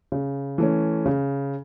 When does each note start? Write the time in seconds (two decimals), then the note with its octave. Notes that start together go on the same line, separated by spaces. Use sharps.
0.12 C#3
0.58 E3 A3 C#4
1.06 C#3